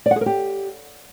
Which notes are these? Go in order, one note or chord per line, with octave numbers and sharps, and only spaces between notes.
D5
F#5
G#4
A#4
G4